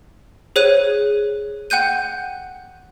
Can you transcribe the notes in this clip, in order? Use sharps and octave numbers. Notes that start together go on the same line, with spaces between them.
G#4 C5 C#5 F#6 D#7
F#5 G5 F#6 G6 D#7